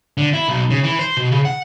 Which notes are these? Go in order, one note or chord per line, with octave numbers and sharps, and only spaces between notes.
D3
E4
B1
C#3
E3
C5
B2
C#3
F#5